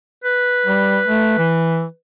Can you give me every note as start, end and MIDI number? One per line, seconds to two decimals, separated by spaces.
0.24 1.95 71
0.66 1.00 55
1.07 1.36 57
1.38 1.85 52